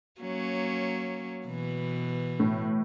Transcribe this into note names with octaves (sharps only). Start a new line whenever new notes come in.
F#3 A#3 C#4
B2 E3
A2